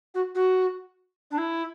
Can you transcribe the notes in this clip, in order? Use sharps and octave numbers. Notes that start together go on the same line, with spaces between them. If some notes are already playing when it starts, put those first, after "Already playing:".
F#4
F#4
D4
E4